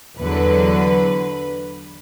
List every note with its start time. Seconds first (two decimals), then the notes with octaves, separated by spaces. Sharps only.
0.19 E2 D3 F#3 B4